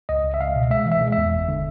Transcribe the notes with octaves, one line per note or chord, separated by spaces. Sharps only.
C#2 D#5
C#2
E5
C#2 F5
B2
G#3 E5
E3
E5
G#3
E2 E5
G1
D3